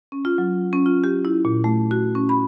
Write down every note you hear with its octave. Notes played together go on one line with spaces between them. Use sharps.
C#4
F4
F#3
C#4
F4
G4
E4
A#2
A3
F#4
C#4
B5